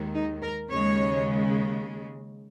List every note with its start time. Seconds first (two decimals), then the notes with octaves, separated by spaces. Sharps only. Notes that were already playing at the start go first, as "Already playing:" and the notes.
Already playing: D#2 D#3 G#3
0.14 D#4
0.42 A#4
0.70 D#2 C#3 G#3 C#5